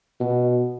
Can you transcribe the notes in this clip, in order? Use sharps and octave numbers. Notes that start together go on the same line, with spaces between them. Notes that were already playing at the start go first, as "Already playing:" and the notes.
B2